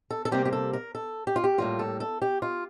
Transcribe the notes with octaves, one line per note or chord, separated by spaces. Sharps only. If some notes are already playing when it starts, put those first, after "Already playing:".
A4
A4
C3 G3 A#3 G4
G4
A4
A#4
A4
G4
F4
G4
A2 G3 A#3 F4
A4
A4
G4
F4